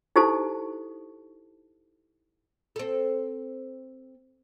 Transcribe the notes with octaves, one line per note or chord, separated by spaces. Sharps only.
D#4 E4 G4 A4 C5 A5
C4 A4